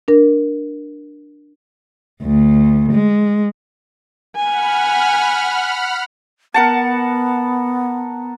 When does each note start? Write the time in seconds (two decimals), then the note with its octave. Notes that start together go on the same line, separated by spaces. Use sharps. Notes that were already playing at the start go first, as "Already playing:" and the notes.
0.08 D4 A#4
2.23 D2
2.92 G#3
4.36 F#5 G#5 B5 F6
6.54 B3 A#4 F#5 A5